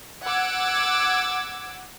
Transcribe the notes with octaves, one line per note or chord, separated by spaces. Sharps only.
F#5 D6 E6 G#6